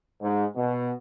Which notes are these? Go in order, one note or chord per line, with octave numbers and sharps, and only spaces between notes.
G#2
B2